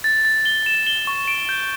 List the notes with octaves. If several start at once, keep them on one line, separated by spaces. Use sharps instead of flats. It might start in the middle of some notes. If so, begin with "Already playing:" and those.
A6
A6
G7
E7
G7
C#6
D7
G6